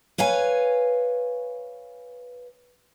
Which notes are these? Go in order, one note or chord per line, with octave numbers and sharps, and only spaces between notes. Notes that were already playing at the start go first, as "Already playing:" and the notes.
B4 C#5 F5 G#5